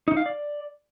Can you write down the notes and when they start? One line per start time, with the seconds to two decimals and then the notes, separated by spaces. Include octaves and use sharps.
0.08 D#4
0.17 F5
0.26 D5